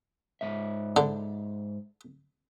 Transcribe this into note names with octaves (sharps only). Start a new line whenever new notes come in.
G#2 E5
D3